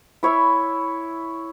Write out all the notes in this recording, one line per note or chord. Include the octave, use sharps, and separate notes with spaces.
E4 C#5 E5